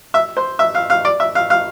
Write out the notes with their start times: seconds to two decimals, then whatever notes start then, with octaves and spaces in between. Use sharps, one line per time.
0.14 E5
0.37 C5
0.59 E5
0.75 F5
0.90 F5
1.05 D5
1.20 E5
1.35 F5
1.50 F5